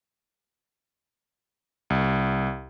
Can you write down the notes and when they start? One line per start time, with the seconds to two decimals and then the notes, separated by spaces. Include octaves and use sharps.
1.90 C2